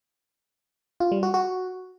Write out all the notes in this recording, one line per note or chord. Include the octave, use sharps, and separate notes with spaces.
F4
G3
F#4
F#4